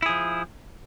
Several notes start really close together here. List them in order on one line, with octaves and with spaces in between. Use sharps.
E4 G#4 F3